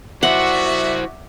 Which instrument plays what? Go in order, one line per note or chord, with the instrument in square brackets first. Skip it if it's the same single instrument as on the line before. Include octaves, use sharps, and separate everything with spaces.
[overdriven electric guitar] E4 C5 [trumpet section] F#4 [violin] D5 E5 [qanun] F#5